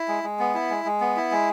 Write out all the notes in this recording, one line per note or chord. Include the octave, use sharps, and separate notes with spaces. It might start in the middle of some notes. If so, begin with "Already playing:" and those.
Already playing: E4
G#3
G#3
B3
E4
G#3
G#3
B3
E4
G#3